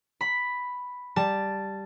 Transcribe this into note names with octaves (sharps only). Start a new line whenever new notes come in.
B5
G3 A5